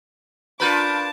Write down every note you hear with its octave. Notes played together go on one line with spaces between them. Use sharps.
D4 F4 A#4 B4 A5 B5 D6 G6